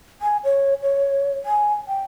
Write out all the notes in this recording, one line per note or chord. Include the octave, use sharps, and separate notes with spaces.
G#5
C#5
C#5
G#5
G5